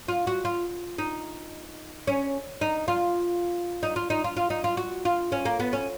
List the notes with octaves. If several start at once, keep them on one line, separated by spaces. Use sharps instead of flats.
F4
F#4
F4
D#4
C#4
D#4
F4
D#4
F4
D#4
F4
F4
D#4
F4
F#4
F4
C#4
A#3
B3
C#4